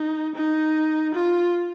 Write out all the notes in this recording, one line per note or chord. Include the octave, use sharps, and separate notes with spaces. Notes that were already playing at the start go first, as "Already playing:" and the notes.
Already playing: D#4
D#4
F4